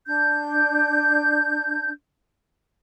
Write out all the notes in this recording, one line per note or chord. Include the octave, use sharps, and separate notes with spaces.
D4 G6